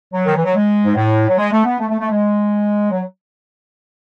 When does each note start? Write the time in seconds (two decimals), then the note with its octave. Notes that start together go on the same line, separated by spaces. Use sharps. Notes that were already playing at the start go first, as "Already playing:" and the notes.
0.13 F#3
0.25 D#3
0.36 E3
0.44 F#3
0.54 G#3
0.84 G#2
0.95 A2
1.28 F#3
1.37 G#3
1.51 A3
1.65 B3
1.79 A3
1.89 A3
1.99 A3
2.10 G#3
2.91 F#3